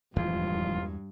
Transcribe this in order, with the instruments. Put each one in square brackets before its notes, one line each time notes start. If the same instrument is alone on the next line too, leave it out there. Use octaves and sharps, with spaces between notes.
[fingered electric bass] D#1 E3 F3 [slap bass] E2 G#3 [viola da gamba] G2 [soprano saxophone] F4